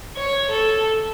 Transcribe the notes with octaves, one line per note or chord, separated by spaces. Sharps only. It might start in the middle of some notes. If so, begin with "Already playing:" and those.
C#5
A4